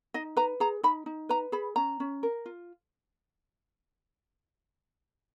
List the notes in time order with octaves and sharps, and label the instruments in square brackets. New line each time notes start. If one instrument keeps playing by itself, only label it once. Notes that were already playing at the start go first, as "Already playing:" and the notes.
[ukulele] D#4 D#5
B4 A#5
G#4 A#5
D#4 B5
D#4
B4 A#5
G#4 B5
C#4 A#5
C#4
A#4
F4